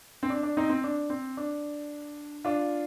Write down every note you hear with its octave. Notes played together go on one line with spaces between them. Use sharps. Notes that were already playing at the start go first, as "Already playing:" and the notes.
C4
D4
D4
C4 D#4
C4
D4
C4
D4
D4 F4